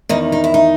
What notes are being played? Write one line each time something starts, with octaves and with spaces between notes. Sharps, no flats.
E2 D#3 D#4
D#4
E4
D#4